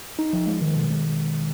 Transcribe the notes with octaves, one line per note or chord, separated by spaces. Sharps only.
D#4
F3
G#3
D#3
B2
G#3